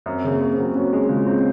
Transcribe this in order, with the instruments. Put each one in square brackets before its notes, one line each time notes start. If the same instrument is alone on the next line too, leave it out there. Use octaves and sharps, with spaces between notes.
[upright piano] F#2 [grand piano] C4
[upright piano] C#3
[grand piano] A#3
[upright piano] F#2
[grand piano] C4
[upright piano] F#3
[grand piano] C#4 [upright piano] F#4
[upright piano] G#3
[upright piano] C#3 [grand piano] F4
[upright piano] C4